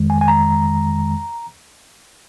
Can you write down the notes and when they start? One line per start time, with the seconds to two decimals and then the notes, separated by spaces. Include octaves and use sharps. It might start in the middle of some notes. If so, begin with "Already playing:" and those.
Already playing: F2 D#3 G#3
0.10 G#5
0.21 G#5
0.28 A#5